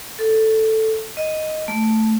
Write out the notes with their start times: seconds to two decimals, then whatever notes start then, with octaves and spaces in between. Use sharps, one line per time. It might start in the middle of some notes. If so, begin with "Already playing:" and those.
0.19 A4
1.17 D#5
1.68 A3